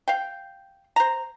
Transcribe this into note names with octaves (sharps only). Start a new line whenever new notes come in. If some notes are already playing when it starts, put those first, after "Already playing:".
F5 G5
C5 A#5